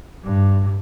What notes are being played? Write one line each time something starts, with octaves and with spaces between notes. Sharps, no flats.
G2